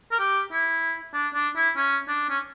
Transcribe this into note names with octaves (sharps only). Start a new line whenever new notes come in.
A#4
G4
E4
D4
D4
E4
C#4
D4
C#4